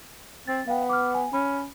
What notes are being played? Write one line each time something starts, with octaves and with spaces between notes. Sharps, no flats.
C4 A6
B3 F5 G5
D6 F6
G#5
C#4 B5